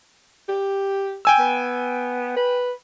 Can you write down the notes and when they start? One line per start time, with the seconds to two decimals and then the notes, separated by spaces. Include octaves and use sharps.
0.49 G4
1.25 G5 G#5 E6
1.39 B3
2.37 B4